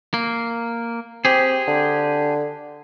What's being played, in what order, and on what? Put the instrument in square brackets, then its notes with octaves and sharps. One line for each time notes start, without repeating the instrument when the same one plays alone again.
[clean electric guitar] A#3
[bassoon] C4 [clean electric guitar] G4 G#4
[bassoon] D3